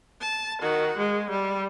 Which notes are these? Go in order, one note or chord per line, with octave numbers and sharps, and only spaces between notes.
A5
D#3 F#4
G#3
G3